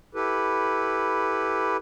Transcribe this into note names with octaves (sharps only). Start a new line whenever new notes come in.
E4 G4 A4 B4